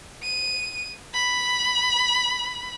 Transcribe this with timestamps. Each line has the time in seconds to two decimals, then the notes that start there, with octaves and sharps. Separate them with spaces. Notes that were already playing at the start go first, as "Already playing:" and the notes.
0.23 D#7
1.14 B5